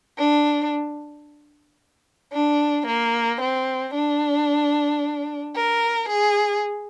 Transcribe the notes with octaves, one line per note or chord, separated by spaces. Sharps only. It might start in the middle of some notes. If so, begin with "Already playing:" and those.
D4
D4
A#3
C4
D4
A#4
G#4